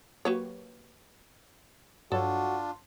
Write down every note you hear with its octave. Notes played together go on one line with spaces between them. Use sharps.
F#3 A#3 F#4 G4 B4 C#5
G2 F#3 D4 F4 F#4 A4 C#5